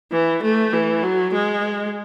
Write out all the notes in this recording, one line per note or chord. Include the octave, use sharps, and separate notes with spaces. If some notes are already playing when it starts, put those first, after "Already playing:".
E3
A3
E3
F#3
G#3